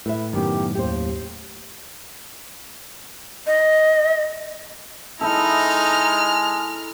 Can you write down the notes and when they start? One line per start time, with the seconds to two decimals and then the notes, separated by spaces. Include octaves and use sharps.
0.06 A2 E4 B4 E5
0.33 F#2 A2 D#3 B3 G4
0.75 D#2 G4 C5
3.47 D#5
5.21 G#3 D#4 E4 A4 A#5 F6